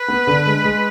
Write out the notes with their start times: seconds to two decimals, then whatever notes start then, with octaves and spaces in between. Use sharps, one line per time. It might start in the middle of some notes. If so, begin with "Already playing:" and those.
Already playing: B4
0.08 B3
0.27 D3
0.46 G#3
0.64 G#3